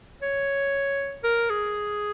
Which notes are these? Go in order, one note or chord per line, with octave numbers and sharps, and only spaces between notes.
C#5
A#4
G#4